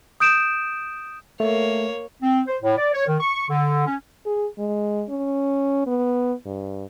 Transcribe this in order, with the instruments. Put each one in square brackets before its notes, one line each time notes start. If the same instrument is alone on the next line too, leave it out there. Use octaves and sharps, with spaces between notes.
[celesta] D#6 G6 D7 E7
[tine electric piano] A3 [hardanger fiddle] A#3 C#5
[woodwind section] C4
C5
A2
D5
C#5
D#3
C#6
D3
C#4
[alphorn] G#4
G#3
C#4
B3
G2